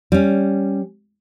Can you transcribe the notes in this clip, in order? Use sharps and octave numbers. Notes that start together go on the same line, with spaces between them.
G3 C#4